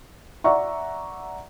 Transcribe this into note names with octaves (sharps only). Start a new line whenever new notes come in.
D5 E5 F#5 A#5 C#6